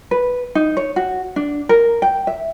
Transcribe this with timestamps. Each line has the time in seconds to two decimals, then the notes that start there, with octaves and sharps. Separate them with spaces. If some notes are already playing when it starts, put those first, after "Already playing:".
0.11 B4
0.55 D#4
0.77 C#5
0.96 F#4
1.36 D4
1.69 A#4
2.02 G5
2.27 E5